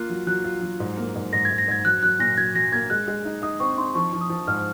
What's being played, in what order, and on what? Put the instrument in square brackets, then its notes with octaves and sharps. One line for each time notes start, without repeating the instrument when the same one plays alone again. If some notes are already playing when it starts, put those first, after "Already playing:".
Already playing: [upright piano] A#3 F4 [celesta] F#6
[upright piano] F#3
[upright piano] F#3 [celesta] F#6
[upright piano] F4
F#3
G#2
A#3
G#2
[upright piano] G#2 [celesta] A#6
[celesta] G#6
[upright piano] G#2
[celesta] A#6
[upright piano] G#2 [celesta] G#6
[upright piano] F#3 [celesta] F#6
[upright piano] F#3 [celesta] F#6
[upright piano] A#2 [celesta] A#6
[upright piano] F#3 [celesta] G#6
[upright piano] F#3 [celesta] A#6
[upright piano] A#3 [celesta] G#6
[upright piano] G#3 [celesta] F#6
[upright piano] G#3
D#4
[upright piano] D#4 [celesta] D#6
[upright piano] C4 [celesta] C#6
[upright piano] D#4 [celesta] C6
[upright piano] F3 [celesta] C#6
[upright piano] F3
[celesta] D#6
[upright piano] F3
[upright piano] G#2 [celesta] F6